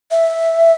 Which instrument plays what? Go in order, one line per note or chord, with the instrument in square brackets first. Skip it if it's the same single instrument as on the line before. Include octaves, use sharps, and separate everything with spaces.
[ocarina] E5